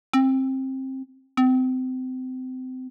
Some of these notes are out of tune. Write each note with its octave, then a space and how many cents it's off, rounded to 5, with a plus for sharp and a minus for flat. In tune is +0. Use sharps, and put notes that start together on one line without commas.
C4 +20
C4 -30